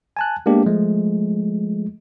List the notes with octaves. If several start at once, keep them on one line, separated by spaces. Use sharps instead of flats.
G#5 A5 F#6
G#3 A#3 B3 D4 G4
F3 G#3 A3